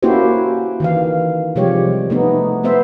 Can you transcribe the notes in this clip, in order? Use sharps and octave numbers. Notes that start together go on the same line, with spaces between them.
A#3 C#4 E4 F#4 G4 C5
D#3 E3 F5
C3 F3 G3 G#3 G4 C#5
A3 B3 D#4
A3 B3 C5 E5